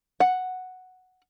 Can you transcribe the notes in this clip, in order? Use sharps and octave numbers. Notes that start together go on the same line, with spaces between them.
F#5